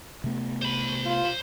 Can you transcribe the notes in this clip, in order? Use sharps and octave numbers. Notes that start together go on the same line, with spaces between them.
C3 A3 B3
C5 B5
F4